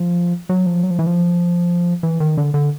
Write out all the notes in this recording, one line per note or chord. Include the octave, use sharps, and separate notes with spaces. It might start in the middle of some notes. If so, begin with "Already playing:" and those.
Already playing: F3
F#3
F3
F#3
F3
E3
F3
E3
D#3
D3
D3